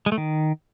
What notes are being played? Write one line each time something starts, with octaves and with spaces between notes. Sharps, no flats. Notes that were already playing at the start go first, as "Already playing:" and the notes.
G#3
A3
D#3